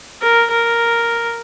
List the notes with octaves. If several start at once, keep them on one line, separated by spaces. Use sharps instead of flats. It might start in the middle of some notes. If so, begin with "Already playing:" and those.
A#4
A#4